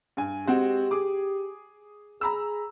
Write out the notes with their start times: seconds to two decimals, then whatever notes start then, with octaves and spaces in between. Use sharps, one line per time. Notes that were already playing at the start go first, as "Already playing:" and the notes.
0.17 G2 G#5
0.47 G#3 C4 F#4 G4
0.91 G#4 D6
2.21 G#4 A#5 B5 E6